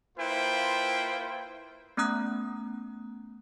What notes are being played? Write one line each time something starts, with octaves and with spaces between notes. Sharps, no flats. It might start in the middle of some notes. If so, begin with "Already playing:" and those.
A#3 E4 F4 B4 C5 G5
A3 B3 C#4 A#5 D#6 F#6